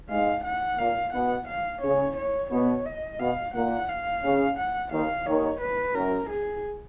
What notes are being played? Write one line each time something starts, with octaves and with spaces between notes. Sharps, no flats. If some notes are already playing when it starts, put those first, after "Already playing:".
G#2 G#3 F5
F#5
A#2 A#3 F5
B2 B3 F#5
F5
C#3 C#4 C#5
C#5
B2 B3 C#5
D#5
B2 B3 F5
A#2 A#3 F#5
F5
C#3
F#5
D#2 D#3 F5
D#2 D#3 C#5
B4
F#2 A#4
G#4